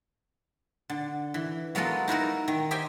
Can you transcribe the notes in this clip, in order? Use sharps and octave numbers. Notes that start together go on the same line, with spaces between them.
D3
E3
F#3 G#3 B3 F4 A4 A#4
D#4 E4 F#4 A#4
D#3
G4 C5 D#5 E5 G5 G#5